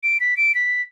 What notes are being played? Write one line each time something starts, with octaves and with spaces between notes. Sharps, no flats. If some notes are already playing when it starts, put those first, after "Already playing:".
D7
B6
D7
B6